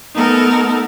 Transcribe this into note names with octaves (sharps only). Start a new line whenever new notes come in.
A3 B3 D#4 A4 A#4